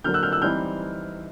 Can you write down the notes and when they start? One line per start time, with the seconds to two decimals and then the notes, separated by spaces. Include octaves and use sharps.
0.04 D3 F#3 A#3 F6 G6
0.14 E6 F#6
0.23 F6 G6
0.32 E6 F#6
0.42 E3 G3 C4 D#4 F6 G6